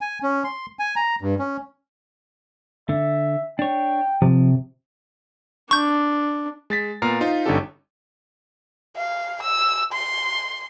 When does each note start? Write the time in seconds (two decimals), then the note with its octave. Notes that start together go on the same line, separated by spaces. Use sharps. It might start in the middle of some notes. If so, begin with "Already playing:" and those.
0.01 G#5
0.23 C#4
0.44 C6
0.79 G#5
0.96 A#5
1.22 G2
1.39 C#4
2.89 D3 E5
3.59 D4 C#5 G5
4.22 C3 F3
5.71 D4 C#6 G6
6.70 G#3 A6 B6
7.02 A#2 B3 A#5 F6 C7
7.21 D#4 F4 C5
7.46 G1 D3 C#4 D#4 G4 A4
8.96 F5
9.43 E6
9.93 C6